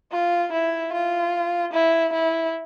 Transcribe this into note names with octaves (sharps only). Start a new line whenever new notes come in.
F4
E4
F4
E4
E4